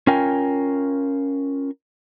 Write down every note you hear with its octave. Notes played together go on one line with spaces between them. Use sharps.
C#4 F4 A#4 G5 G#5